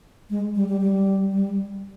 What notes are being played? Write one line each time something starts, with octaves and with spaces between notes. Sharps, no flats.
G#3
G3
G3
G3
G3